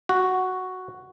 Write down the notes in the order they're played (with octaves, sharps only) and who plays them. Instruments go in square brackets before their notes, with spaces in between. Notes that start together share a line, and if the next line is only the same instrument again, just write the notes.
[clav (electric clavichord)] F#4